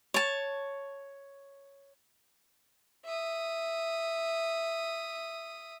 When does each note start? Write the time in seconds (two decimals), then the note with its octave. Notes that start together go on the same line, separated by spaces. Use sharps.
0.14 C#5 A5
3.05 E5 D#6